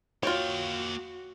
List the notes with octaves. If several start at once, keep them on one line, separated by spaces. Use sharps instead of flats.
A#3 F4 F#4 C#5 G5